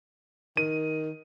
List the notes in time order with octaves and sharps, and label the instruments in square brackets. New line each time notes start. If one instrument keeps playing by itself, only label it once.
[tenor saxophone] D#3 [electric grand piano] D#7